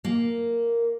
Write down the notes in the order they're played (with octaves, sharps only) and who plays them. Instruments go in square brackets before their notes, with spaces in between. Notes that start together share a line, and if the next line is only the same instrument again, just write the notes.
[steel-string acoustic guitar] A#3